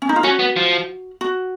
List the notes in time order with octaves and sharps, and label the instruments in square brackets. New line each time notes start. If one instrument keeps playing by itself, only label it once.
[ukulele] C#4
D#4
F4
[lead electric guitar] C#4 [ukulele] F#4
[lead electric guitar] B3
F3
[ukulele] F#4